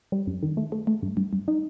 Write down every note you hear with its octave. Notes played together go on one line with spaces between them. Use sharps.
G3
F#2
D#3
A3
A3
A3
G2
G2
G2
D#4